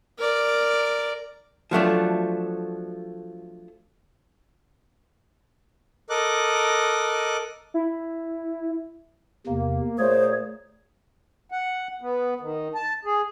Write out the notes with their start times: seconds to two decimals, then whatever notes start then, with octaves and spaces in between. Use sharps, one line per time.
0.18 A#4 D5
1.71 F3 F#3 A3 D4
6.10 A4 A#4 D#5 D6 F#6
7.74 E4
9.47 E2 C3 A#3
9.99 A#2 A3 G#4 C5 C#5
11.51 F#5
12.01 B3
12.41 D#3
12.75 A5
13.05 G#4